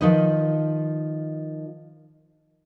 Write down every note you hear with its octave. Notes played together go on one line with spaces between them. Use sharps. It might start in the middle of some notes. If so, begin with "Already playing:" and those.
D#3 F3 D#4 B4 D#5